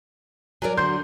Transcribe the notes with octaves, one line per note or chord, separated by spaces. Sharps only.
F#3 A#4 C#5 D5 G#5
D3 F#4 C6 G6